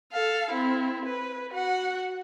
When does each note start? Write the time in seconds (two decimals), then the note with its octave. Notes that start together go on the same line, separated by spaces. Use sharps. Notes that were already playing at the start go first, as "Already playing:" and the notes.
0.13 A4 F5
0.51 C4 E4
1.05 B4
1.51 F#4 F#5